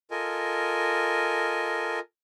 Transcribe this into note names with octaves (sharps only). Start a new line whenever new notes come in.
F4 A4 A#4 D#5 G#5